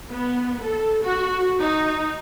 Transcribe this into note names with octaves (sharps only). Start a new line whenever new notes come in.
B3
A4
F#4
D#4